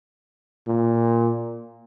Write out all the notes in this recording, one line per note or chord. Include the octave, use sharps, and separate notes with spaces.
A#2